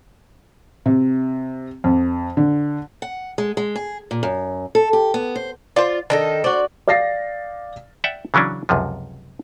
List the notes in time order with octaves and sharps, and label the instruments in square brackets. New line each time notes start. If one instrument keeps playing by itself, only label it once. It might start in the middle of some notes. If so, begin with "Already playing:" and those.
[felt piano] C3
F2
D3
[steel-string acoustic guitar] F#5
G#3
G#3
G#4
A#2
F#2
A4
G4
B3
C5
[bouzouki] F4 [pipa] C5 D5
[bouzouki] D#3 D#4 A4 [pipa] D4
[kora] F#4 D5 [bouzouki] C5
[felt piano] D5 F5 A6 A#6 C7
[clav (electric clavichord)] D5 E5 F#5 G5
C#3 E3 F#3 C#4 D4
C#2 F#2 C3 F3